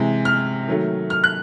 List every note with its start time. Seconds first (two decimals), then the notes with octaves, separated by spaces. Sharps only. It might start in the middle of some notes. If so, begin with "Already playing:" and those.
Already playing: C3 E3 G#3
0.25 F6
0.68 D#3 F#3 A3
1.10 F6
1.24 F#6